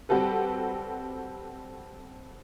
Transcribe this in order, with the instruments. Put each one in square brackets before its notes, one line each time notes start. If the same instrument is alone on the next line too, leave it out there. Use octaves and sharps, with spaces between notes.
[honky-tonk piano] G3 C4 F#4 G4 A4 B4